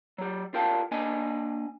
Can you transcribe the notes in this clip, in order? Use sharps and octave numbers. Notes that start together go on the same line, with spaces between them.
F#3 G4
F4 G4 A#4 F5 G5 A5
A#3 D4 D#5 G#5